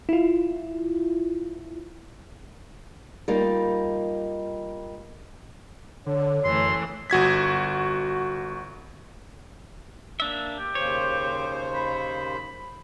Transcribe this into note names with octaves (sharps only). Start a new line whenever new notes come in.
E4 F4
G3 A#3 D#4 F4
D3 C#5
F#2 E3 A3 C6
G1 F#4 G#6 B6
A#3 D4 E5
G4
D#2 C#3 C5 C#5
B5